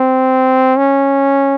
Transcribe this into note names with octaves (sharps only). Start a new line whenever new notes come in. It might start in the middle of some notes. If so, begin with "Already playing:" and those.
Already playing: C4
C#4